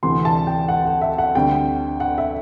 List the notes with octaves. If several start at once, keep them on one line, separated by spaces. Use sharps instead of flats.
D2 C3 E3 C6
A5
G5
F#5
F#5
E5
F#5
D2 D3 G3 C4 G5
F#5
E5